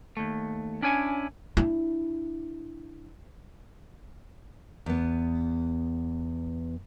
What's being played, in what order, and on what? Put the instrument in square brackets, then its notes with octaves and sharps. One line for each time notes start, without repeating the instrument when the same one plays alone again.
[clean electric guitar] D#2 A3
C#4 D4 E4 C#5 G#5
[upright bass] D4 E4
[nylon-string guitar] E2 B3